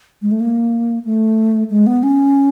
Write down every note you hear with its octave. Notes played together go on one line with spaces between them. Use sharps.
G#3
A3
A#3
A3
G#3
B3
C#4